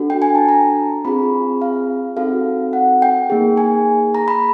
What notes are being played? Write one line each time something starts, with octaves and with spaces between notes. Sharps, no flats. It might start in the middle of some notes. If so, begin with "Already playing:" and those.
Already playing: D4 F#4 A4
G5
G#5
A5
A#5
C4 F4 G#4 B5
F5
C4 D#4 F#4 A4 F5
F#5
G5
A#3 D#4 G#4
G#5
A#5
B5